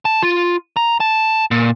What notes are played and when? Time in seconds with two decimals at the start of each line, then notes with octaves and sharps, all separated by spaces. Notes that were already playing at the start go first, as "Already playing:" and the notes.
0.05 A5
0.23 F4
0.77 A#5
1.00 A5
1.51 A#2